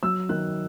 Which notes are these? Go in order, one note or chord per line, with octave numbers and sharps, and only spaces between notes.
F#3 E6
D#3 F#6